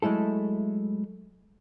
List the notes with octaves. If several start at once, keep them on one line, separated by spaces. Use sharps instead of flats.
F#3 G#3 A3 E4 A4